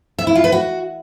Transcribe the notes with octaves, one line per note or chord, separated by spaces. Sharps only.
E5
E4
F4
B4
F#4